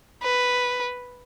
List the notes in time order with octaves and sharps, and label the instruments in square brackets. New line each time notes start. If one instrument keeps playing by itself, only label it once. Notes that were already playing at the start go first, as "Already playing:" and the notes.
[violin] B4